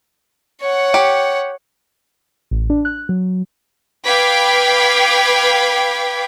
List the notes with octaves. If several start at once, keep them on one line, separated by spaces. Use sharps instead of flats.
C#5 F#5
G4
A1
D4
F#6
F#3
B4 F5 G5 D6 G#6 B6